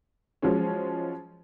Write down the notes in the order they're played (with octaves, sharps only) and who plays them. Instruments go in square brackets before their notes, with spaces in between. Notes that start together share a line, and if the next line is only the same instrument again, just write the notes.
[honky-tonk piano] F3 F#3 G#3 C#4